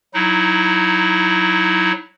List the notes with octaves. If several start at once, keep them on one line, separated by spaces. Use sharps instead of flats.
F#3 D#4 E4